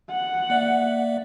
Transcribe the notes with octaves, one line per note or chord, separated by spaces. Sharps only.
F#5
A#3 D5 E5